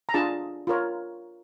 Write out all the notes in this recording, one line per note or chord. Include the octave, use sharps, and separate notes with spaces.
A#5
D4 F4 G#4 A5
F4 A#4 C#5